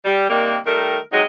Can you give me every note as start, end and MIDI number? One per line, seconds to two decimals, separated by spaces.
0.05 0.29 55
0.29 0.56 48
0.29 0.56 51
0.29 0.56 55
0.29 0.56 58
0.65 0.97 51
0.65 0.97 55
0.65 0.97 57
0.65 0.97 70
1.12 1.22 48
1.12 1.22 54
1.12 1.22 56
1.12 1.22 63
1.12 1.22 75